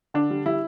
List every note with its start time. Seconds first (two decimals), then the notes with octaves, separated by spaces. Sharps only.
0.14 D3 D4
0.31 G3
0.46 G3 E4